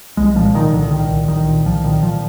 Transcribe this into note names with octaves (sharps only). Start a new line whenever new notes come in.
C2 G#3
A#2 F3
A#2 D#3
C2 D3
A#2 D#3
C2
C2 D#3
A#2
C2 F3
A#2 D#3
A#2 F3